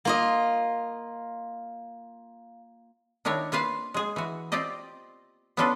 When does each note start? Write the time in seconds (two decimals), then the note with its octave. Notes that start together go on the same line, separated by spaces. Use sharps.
0.05 A#3 F4 D#5
3.25 D#3 D4 E4 A#4 C#5
3.52 A#3 F4 B4 F5
3.94 G#3 G#4
4.16 E3 F#4
4.52 C4 F4 G4 D5 D#5
5.57 B3 C#4 D4 F4 A4 B4